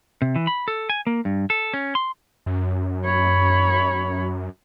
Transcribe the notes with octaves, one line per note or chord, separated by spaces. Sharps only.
C3
E3
B5
A4
G#5
A#3
G2
A4
C#4
C6
F#2
C#5 B5